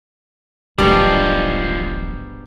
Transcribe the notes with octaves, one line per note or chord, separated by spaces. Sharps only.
D1 A1 G#2 B2 F3 G3 G#3 D4